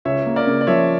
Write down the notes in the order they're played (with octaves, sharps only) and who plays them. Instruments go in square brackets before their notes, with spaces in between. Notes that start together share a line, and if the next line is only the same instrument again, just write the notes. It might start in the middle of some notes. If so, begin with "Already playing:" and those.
[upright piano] C#2 [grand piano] C#5 E5
[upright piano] A#3
[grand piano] A#4 D5
[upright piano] C#3
[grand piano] D5
[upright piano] F3 [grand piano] C#5 E5